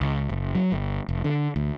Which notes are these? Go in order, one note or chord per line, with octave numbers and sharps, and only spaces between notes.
C#2
F#1
F#3
G1
F1
D3
D2